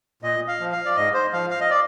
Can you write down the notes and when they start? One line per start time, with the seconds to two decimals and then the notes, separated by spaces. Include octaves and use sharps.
0.22 A#2 D#5
0.48 F5
0.60 F3
0.72 F5
0.85 D5
0.96 G#2 D#5
1.14 C5
1.32 F3 F5
1.50 F5
1.60 D#5
1.70 D5